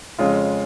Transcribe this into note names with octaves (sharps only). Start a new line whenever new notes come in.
F2 C#3 G#3 C#4 F4